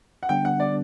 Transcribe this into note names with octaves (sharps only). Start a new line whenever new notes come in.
F#5
D3 G3 B3 D4 G5
F#5
D5